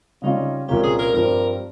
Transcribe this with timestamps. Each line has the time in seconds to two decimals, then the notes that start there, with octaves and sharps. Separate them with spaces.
0.22 C#3 G3 C#4 D#4 F4
0.68 C2 A#2 F3 A#3 C#4 G4
0.83 G#4
0.99 A#4
1.14 G2 F3 C4 G4 A#4